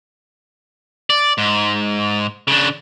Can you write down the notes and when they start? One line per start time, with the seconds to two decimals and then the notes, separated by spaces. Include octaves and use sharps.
1.10 D5
1.38 G#2
2.48 C#3 D4